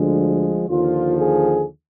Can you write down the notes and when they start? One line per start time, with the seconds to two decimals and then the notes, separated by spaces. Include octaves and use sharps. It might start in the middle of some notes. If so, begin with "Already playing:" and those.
Already playing: D2 D3 F3 G#3
0.67 D#2 D3 F3 F4
1.18 G#4